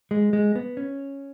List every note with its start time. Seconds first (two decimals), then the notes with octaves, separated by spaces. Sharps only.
0.11 G#3
0.33 G#3
0.55 B3
0.77 C#4